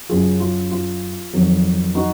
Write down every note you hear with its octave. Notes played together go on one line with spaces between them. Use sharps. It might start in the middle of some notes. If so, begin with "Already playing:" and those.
F#2 C#3 F#3 F4 G#4
F4
F4
F2 D#3 F#3
D#4 F#4